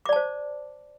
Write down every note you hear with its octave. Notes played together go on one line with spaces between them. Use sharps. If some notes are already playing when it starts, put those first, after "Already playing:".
C5 D5 A5 D6